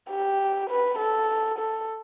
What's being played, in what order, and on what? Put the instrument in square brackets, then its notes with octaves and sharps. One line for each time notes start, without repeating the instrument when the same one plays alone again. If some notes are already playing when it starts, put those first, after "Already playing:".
[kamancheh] G4
B4
A4
A4